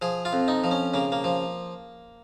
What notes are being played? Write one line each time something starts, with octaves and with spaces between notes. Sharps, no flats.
F3 G#4
F4
F2
D#4
F3
C#4
C#3 A#3
A#3
F3